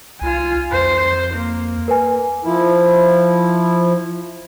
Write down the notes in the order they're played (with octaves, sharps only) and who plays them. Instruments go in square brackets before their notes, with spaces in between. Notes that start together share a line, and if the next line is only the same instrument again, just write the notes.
[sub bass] C2 [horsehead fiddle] F4 G#5
[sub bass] F2 [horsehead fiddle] C5
[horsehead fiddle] A#3
[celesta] A#4 B4 G#5
[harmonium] F3 E4